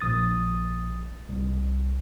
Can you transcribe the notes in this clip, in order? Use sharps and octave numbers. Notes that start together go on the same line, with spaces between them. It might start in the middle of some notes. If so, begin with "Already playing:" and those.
A#1 D#6 A6
C2